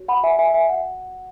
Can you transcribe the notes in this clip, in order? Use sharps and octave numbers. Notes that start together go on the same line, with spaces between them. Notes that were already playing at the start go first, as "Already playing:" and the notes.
Already playing: F#4 C#5
F#5 B5
E5 G#5
E5 G#5
E5 G#5
F#5